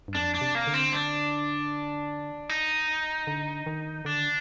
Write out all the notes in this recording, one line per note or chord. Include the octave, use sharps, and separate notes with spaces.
G2
F2 D4
D4
C3
A#3
D3
C4
D4
D#4
D3
D#3
D3 D4